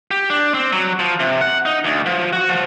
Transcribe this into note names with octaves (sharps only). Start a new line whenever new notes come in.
G4
D4
C4
F#3
F3
C3
F#5
D#4
D2
F3
F#4
F3